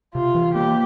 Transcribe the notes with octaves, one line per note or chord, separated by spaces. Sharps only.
C3 F4
E3
A#3 G4